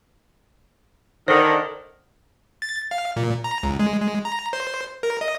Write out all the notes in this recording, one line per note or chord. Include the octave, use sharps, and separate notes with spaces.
D3 D#3 C5
A6
F5
A#2
A#5
C#2
G#3
G#3
A#5
C5
A#4
D#5